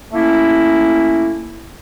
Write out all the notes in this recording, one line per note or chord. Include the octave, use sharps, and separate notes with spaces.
A3 A#3 C#4 E4